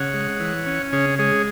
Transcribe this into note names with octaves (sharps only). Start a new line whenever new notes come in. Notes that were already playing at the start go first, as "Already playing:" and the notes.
Already playing: C#3 C#5 F#5
G#3
E3
C#4
C#3 G#4 C#5
G#3 G#4 C#5